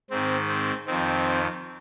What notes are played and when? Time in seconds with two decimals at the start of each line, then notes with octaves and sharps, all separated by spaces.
0.10 G#2 D#3 C4
0.48 C4
0.86 F2 D#3 C4